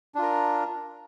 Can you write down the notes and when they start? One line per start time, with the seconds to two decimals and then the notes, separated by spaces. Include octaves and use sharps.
0.15 D4
0.19 F4
0.22 A#4